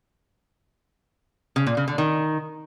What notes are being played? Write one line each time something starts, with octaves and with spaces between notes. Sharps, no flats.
C#3
A#2
C#3
D3
D#3